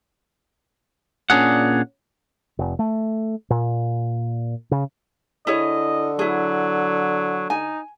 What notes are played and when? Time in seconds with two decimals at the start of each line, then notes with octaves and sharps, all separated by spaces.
1.30 A#2 C#4 D4 G#4 F#5
2.59 F1
2.79 A3
3.50 A#2
4.71 C#3
5.47 D3 E4 G#4 C#5 D#5
6.19 F#3 E4 G#4
7.50 D#4 G#5